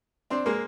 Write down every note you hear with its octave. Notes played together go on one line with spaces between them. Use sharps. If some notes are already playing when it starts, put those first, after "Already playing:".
C4 D4
G#3 A#3